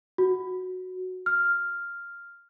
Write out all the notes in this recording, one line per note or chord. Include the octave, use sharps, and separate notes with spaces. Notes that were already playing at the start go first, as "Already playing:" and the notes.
F#4
F6